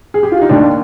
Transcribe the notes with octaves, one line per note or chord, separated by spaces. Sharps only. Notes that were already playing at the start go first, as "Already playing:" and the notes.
G#4
G4
F4
D#4
D#2 D#3 D4